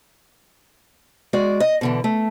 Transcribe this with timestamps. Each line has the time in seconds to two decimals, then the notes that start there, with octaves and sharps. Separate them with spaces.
1.33 G#3 F#4 D5
1.60 D#5
1.81 B2 D3 E3
2.04 A3